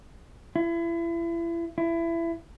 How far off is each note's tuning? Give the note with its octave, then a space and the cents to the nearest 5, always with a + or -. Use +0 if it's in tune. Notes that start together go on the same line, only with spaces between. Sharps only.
E4 +35
E4 +25